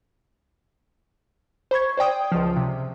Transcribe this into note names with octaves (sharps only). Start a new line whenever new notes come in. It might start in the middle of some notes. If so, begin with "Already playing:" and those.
C5 B5 C#6 G#6
C5 D5 G5 D#6
C#2 F3
C3